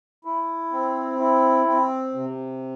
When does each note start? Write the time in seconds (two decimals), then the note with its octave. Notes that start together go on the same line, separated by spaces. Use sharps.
0.25 E4
0.71 C4
1.19 E4
1.66 C4
2.14 C3